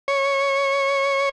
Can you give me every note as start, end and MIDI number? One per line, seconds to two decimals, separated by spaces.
0.08 1.29 73